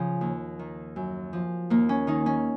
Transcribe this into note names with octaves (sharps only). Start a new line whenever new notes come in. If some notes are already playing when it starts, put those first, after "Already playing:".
Already playing: C#3 F3
D#2
D#3
F#2
F3
D#2 A#3
C#4
D#3 D#4
C#4